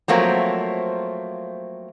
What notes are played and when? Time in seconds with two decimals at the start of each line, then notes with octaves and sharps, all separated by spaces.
0.08 F3 F#3 A3 A#3 C4